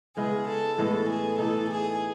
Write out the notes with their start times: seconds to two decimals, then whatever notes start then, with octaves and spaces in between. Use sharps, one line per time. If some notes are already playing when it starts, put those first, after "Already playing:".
0.17 C#3 G#3 B3 E4 G#4
0.47 A4
0.78 A2 E3 G#3 B3 A4
1.08 G#4
1.38 E3 A3 D#4 A4
1.69 G#4